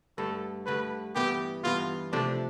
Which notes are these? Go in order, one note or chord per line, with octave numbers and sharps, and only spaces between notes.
G2 D3 A3 A4
G2 D3 A3 B4
G2 E3 B3 E4 G4
G2 E3 B3 E4 F4
C3 F3 A3 D4